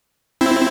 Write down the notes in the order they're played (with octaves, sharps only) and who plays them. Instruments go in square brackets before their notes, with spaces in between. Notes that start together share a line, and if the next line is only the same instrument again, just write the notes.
[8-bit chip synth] C4 E4